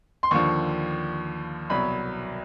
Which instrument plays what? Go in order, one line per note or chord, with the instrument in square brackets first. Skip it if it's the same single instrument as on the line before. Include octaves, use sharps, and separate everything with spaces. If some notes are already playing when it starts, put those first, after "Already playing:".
[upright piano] C6
D#2 D3 F3 C#6
C2 B2 F#3 B5